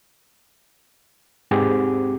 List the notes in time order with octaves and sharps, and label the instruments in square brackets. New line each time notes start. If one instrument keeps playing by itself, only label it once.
[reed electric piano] G#2 C4 G4 G#4 F#5 D6